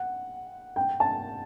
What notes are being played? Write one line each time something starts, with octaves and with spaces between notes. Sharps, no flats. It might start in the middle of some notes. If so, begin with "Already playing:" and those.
Already playing: F#5
G5
A5